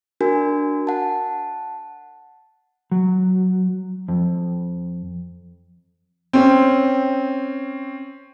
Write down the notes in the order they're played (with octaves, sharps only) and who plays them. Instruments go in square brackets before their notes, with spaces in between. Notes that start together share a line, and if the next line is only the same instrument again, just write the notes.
[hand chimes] D4 F#4 A#4 G#5
F#5 A5
[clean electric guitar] F#3
F2
[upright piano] C4 C#4